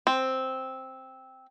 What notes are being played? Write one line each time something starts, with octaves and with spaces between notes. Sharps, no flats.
C4